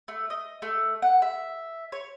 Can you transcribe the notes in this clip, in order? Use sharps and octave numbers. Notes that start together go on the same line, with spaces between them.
A3
D#5
A3
F#5
E5
C#5